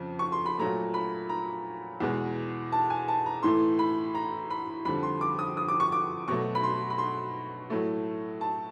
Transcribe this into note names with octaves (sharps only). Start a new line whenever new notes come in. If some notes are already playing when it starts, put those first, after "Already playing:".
Already playing: F2 C#3
C#6
C6
B5
A#2 F#3 A3 A#5
B5
A#5
E2 B2 G#3
A5
G#5
A5
A#5
A2 E3 A3 C6
B5
A#5
B5
F2 D3 G3 B5
C6
D6
D#6
D#6
D6
C#6
D6
B2 F#3 A3 C#6
B5
C6
B5
C6
A2 F#3 A3
A5